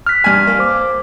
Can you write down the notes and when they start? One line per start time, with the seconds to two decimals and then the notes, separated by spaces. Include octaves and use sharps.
0.06 F6 F#6 B6
0.24 G2 G#5
0.47 A#3
0.59 C5 D6